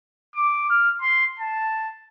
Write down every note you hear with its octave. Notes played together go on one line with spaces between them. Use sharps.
D6
F6
C6
A5